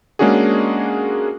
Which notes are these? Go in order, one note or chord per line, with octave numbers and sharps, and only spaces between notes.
G#3 A#3 C#4 D4 F#4 G#4